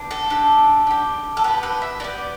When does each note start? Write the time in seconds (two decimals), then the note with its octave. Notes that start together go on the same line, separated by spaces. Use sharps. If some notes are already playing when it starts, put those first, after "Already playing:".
Already playing: B3 D4 G4
0.11 A4
0.30 D4 G4
0.87 D4 G4
1.37 A4
1.44 B3 G4 B4
1.63 B4
1.82 E5
2.00 B3 G4 D5